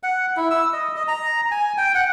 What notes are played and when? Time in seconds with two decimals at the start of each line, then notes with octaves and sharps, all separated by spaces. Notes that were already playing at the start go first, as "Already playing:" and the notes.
0.03 F#5
0.37 E4
0.51 E6
0.73 D#5
0.96 D#5
1.08 A#5
1.51 G#5
1.78 G5
1.95 F#5